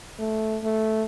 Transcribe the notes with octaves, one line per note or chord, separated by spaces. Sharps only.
A3
A3